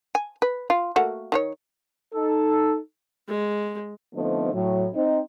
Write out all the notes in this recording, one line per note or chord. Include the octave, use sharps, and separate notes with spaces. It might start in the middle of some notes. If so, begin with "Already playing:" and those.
G#5
B4
F4
A3 A#3 F#4
D#3 F4 C#5
D#4 A4
G#3
D3 F3 A3 B3 C4 D#4
A2 F#3
C4 D#4